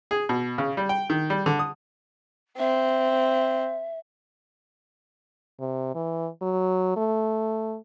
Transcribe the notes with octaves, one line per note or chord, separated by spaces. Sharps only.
G#4
B2
C#3
G3
G5
D#3
G3
D3
D#6
C4 E5
C3
E3
F#3
A3